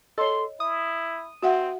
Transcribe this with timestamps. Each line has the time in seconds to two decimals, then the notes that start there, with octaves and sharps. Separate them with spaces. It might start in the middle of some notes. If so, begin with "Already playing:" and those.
0.18 A4 C#5 D#5 C6
0.60 E4 D#6
1.43 C4 F#4 E5 F#5